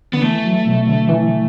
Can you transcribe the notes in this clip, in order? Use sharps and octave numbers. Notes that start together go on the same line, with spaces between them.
D3 B3
E3 A3
F#3
B2
D3
E3